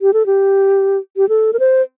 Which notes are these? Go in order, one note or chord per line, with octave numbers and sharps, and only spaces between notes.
G4
A4
G4
G4
A4
A#4
C5